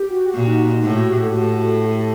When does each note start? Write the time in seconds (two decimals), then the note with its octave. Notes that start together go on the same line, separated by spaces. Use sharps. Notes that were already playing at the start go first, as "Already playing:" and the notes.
Already playing: G4
0.10 F#4
0.25 G4
0.34 A#2 F#4
0.47 D#4
0.59 F#4
0.71 F#4
0.83 A2 G4
0.97 F#4
1.09 G4
1.21 A4
1.34 A2
1.83 A4
1.96 G4